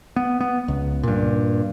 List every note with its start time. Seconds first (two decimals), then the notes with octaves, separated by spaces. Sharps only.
0.16 B3
0.41 B3
0.68 C#2
1.03 G2 A#2